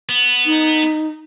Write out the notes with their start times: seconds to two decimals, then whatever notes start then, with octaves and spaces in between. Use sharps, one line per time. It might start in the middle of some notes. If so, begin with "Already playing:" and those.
0.09 B3
0.46 D#4